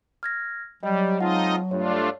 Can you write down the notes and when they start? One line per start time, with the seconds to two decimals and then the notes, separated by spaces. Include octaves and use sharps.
0.23 F6 G#6 A#6
0.83 F#3 G3 D#5
1.20 G#3 C4 D#4 F4 D#5 F#5 A5
1.71 G2 A3 D4 F4 C#5